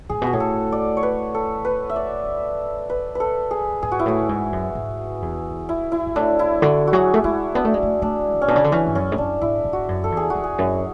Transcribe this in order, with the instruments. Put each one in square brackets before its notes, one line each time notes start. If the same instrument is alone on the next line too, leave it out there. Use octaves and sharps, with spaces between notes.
[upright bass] A2 [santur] G#4
[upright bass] B2
[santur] F#4
[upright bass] A2 [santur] G#4
[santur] A4
D5
C#5
B4
A4
B4
E5
D5
B4
A4 B4
G#4
[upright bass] G#2 [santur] G#4
[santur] F#4
E4
[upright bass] A2 [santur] F#4
[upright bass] G#2
F#2
G#2
E2
[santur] E4
E4
[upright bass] G#2
[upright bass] A2 [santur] D4
[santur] E4
[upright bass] D3 [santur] F#4
[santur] F#4
[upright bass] F#3 [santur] G#4
[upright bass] A3
[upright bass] G#3 [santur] E4
[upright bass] B3 [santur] D4
[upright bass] A3
G#3
A3
[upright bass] A3 [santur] D4
[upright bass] A2 [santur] C#4
[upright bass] B2 [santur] D4
[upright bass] C#3
D3
[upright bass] E3 [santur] C#4
[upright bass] G#2
[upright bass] F#2 [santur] C#4
[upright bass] G#2
[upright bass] F#2 [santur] D4
[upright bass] G#2 [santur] E4
[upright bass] G#2
[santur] F#4
[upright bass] F#2
[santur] A4
[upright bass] E2
[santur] G#4
F#4
[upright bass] E2
[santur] G#4
[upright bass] F#2